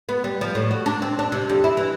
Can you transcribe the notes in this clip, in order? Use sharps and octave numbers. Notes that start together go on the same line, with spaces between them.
B3
G3
F3
A2
F#4
D4
C4
D4
C3
F2
E4
E3